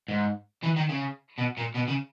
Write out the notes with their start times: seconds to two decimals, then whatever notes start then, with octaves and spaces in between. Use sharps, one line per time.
0.08 G#2
0.63 E3
0.76 D#3
0.89 C#3
1.38 B2
1.57 A#2
1.74 B2
1.87 C#3